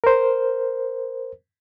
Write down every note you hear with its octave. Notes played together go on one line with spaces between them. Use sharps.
A#4 C5